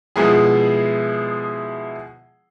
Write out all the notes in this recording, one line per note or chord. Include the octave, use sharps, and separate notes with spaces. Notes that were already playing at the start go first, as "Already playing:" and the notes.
B2 F3 G#3 E4 G#4